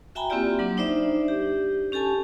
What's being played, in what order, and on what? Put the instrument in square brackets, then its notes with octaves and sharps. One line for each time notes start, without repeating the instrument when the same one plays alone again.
[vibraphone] F#4 E5 G5 G#5 A#5 B5
A#3 C4 E4 F4 G4 D5
F#3 A#3 D4
D4 D#4 C5 D5 E5
G4
C#4 G4 A4 G#5 A5